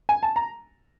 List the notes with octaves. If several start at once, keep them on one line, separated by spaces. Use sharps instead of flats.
G#5
A5
A#5